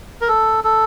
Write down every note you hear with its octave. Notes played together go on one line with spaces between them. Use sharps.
A#4
A4
A4